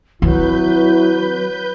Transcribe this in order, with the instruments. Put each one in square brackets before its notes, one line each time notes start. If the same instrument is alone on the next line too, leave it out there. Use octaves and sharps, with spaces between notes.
[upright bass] D#3 C4 [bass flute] F#3 [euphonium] E4 [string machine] B4 G6